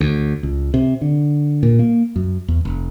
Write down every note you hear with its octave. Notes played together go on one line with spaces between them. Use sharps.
D2
C#2
C3
D3
A#2
A#3
F#2
E2
F1